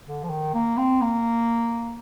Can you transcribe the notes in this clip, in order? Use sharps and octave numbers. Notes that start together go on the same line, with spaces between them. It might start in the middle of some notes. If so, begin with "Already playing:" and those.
D3
F3
D#3
A#3
C4
A#3